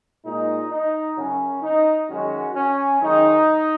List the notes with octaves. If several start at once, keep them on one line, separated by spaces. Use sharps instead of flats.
A#2 G#3 D#4
D#4
F#2 C#3 F#3 C#4
D#4
F#2 D#3 G#3 C#4 F#4
C#4
F#2 D#3 G#3 D#4